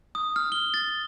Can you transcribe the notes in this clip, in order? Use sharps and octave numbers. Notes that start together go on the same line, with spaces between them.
D#6
F6
G7
A6